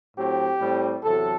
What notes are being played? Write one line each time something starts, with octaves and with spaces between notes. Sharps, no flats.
A2 F#3 C4 G4
A2 G3 C4
E2 C3 F#3 A4